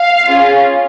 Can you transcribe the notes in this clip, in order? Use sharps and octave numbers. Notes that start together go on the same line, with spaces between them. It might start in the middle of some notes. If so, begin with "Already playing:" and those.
Already playing: F5
C#4 F4 G#4